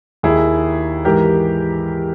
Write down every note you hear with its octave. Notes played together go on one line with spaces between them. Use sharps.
D#2 D#3 E4 G#4
G#2 E3 G4 A#4